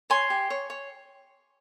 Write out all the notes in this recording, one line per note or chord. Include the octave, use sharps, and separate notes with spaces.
C#5 G#5 C6
G4
C#5
C#5